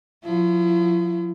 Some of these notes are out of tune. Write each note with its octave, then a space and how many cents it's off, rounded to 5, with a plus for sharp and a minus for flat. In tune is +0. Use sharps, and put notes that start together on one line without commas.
F3 +40 E4 +45